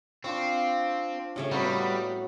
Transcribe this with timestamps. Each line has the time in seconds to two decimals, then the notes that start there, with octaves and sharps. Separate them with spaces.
0.24 C4 D4 F4 C#6
1.36 A2 C#3 A3
1.51 F#3 G3 B3 C4 B4 C#6